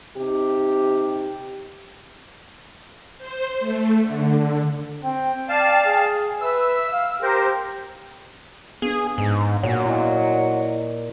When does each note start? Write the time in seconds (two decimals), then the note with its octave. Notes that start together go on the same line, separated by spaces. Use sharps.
0.17 C3 D#4 G4
3.18 C5
3.60 A3
4.02 D3
5.03 C4 G5
5.49 D5 F5 A5
5.86 G#4
6.41 B4 E5 E6
6.93 F5 F6
7.22 G4 A#4 C5
8.82 B3 D4 G#4
9.18 G#2
9.63 A#2 F#3
9.86 E4 D#5